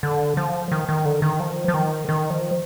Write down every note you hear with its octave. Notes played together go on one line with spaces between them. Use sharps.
D3
F3
D#3
D#3
D3
D#3
F3
F3
D#3
D#3
F3